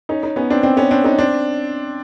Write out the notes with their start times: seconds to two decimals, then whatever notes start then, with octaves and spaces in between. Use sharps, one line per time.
0.09 C#4 D#4
0.23 C#4 D#4
0.36 B3 C#4
0.50 C4 D4
0.63 C4 D4
0.77 B3 C#4
0.91 C4 D4
1.04 C#4 D#4
1.19 C4 D4